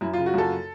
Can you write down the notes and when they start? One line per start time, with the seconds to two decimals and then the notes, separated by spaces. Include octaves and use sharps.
0.01 F#2 E4
0.14 F4
0.18 C#3
0.26 F#4
0.34 F#2 A4